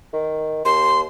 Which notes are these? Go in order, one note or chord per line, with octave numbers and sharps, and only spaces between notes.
D#3
D#2 C6